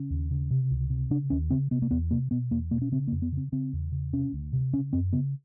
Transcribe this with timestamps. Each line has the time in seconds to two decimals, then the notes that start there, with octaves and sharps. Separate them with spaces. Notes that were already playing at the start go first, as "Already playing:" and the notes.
Already playing: C#3 C#4
0.10 D#2
0.31 C#3
0.51 C3
0.71 C#2
0.90 C3
1.10 C#3 D4
1.30 D#2 C#4
1.50 C#3 C4
1.71 C3 B3
1.82 A#3
1.91 E2 B3
2.11 C3 A#3
2.31 B2 B3
2.51 E2 A#3
2.71 B2 A#3
2.82 C#4
2.92 C#3 C4
3.08 A#3
3.12 F2
3.22 B3
3.32 C#3 C4
3.52 C#3 C4
3.73 E2
3.92 C#3
4.13 C3 C#4
4.33 D2
4.53 C3
4.73 C#3 C#4
4.93 F#2 C4
5.13 C#3 B3